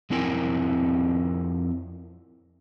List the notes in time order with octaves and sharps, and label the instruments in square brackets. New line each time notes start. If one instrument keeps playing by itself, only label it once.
[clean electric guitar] F2 C4 E4 A#4 G5 G#5